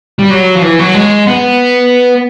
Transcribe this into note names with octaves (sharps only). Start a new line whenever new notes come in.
G3
F#3
F3
E3
F#3
G#3
B3